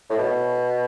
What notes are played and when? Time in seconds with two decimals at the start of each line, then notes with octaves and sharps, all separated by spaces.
0.10 A2
0.18 B2